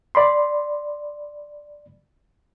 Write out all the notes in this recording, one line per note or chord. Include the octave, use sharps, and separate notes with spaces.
D5 B5 C6